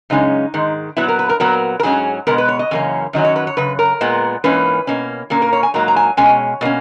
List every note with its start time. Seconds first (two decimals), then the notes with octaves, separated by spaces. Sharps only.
0.10 F#2 C#3 G#3 C#4 D#4
0.54 G#2 D#3 G#3
0.97 A#2 F#3 B3 E4
1.08 A#4
1.19 B4
1.29 A#4
1.40 A#2 F#3 B3 A#4
1.80 A#4
1.83 G#2 F#3 C#4 G#4
2.27 B2 G#3 B3 A#4
2.38 B4
2.49 C#5
2.59 D#5
2.71 F#2 C#3 E3 A#3 C#4
3.13 F#2 D#3 F#3 C#4 D#5
3.25 C#5
3.36 B4
3.47 C#5
3.57 F#2 C#3 B4
3.79 A#4
4.01 A#2 G#3 B3
4.44 G#2 E3 A#3 C#4 B4
4.87 B2 A#3 C#4
5.30 A#2 A#3 C#4 A#4
5.42 A#4
5.53 C#5
5.63 G#5
5.74 G#2 F#3 A#3 A#5
5.88 A#5
5.96 G#5
6.17 B2 G#3 C#4 G#5
6.61 B2 A#3 C#4